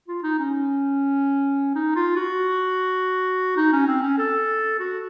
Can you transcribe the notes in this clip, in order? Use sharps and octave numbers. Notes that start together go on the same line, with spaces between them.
F4
D#4
C#4
D#4
F4
F#4
D#4
C#4
C4
C#4
A4
F#4